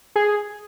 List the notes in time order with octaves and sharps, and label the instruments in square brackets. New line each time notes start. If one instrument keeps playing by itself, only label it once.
[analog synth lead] G#4